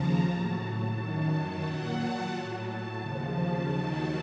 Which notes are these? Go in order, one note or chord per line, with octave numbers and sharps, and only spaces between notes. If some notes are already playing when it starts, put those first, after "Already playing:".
Already playing: D#2 C#3 F3 A5 A#5
A2 F#3 A5
F#2 D#3 F#3
A#2 F#3 F#5
A5
A2 F#3
A5
D#2 C#3 F3
D#2 D#3 F#3